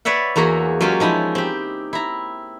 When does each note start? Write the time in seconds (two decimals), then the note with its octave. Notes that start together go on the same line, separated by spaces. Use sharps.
0.05 B4 C#5 D5 E5 F#5
0.36 E2 A#3 F#4 G#4 A#5
0.81 F#3 G#3 C#4 F4 G4
1.00 F3 G#3 D#4 E4
1.35 C4 G4
1.93 E4 A#5